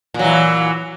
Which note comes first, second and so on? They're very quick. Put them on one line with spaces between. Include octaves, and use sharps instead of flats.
A#2 F#3 E3